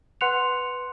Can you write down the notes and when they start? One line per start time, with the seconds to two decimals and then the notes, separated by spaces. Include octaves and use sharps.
0.21 B4 F#5 C6 F#6 C#7 F7